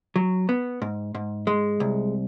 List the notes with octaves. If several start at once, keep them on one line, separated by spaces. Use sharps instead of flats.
F#3
B3
G#2
G#2
G#3
C2